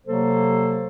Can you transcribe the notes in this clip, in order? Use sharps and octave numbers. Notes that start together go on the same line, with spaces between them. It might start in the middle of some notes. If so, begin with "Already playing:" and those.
C3 F#3 A#3 A4 C5